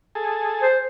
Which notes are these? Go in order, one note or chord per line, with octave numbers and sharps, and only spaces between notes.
G#4 A4
C5